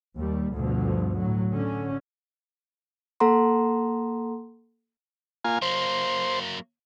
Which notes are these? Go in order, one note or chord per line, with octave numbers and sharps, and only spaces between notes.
D#2 G3
D2 G2 B2 D3 F3
A2 F#3
D3 C#4
A#3 A4 F#5 A#5 C6
A#3 F4 G#5
F#3 A#3 C5